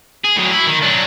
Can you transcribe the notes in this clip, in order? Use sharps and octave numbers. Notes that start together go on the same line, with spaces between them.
G#4
A2 F#3
E4
D#3
F#3 D4